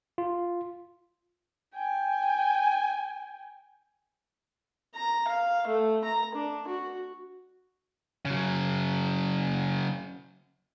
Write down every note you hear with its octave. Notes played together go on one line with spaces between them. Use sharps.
F4
G5 G#5
A#5
F5
A3
A#5
D4
F#4
C#3 F#3